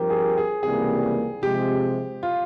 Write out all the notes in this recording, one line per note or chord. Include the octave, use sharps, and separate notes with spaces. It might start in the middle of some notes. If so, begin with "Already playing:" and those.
Already playing: G2 F3 C4 G4 A#4
G#4
G#4
C#2 C3 E3 G3 A#3 G#4
C3 F3 G#3 G4
F4